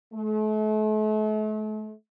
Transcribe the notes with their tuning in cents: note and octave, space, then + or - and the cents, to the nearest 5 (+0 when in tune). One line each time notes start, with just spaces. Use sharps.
A3 -40